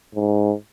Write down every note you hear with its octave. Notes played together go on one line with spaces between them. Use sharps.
G#2